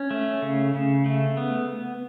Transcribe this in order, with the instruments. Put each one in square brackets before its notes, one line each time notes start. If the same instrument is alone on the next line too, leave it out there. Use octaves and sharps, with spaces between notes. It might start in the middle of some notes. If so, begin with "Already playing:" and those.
Already playing: [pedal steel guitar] C#4
A3
C#3
C#3
A3
B3